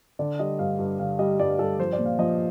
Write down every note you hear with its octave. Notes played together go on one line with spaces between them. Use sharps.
D3 D5
G3 D#5
G2 F5
G2
D3 F5
G3 D#5
G2 D5
G2 A4
F3 C5
D5
A#2
F5
F3 D#5